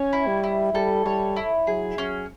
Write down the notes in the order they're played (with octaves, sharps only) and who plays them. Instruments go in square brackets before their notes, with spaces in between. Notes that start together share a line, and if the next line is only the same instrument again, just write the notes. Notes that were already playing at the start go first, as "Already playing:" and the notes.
Already playing: [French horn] C#4 [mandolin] C#5
[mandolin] E4
[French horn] G3
[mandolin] E4
[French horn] G3 [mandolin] A4
[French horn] G3 [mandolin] C#5
[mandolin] E4
[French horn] F#3 [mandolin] G#4
[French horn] F#3 [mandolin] C#4